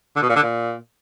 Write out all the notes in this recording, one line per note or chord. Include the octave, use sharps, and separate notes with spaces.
D3
B2
A#2
D3
A#2